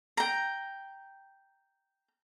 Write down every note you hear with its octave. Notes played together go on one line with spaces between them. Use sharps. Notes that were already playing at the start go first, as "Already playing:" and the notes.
G5 A#5